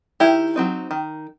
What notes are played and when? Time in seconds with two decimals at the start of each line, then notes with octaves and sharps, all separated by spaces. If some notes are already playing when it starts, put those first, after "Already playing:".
0.20 D#3 E4 G4
0.56 F#3 C4 D#4
0.91 D#3